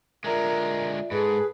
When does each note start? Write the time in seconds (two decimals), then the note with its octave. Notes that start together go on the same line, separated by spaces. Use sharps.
0.24 D3 G#3 F4 A#4 D5 E5
1.11 G#2 G#4 A4 B4 A5